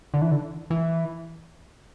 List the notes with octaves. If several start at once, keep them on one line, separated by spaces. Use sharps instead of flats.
D3
E3
D3
E3